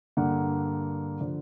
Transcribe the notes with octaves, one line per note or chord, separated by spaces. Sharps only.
G2 D3 G3 A#3 F#5
D3 F3